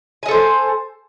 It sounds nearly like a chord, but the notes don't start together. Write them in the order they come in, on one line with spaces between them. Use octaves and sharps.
G#5 D#5 A4 C5